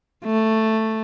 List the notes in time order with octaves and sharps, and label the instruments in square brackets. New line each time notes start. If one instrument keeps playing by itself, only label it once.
[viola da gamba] A3